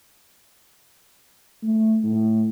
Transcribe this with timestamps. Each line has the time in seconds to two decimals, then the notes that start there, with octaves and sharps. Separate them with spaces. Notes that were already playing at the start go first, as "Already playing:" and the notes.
1.63 A3
2.03 A2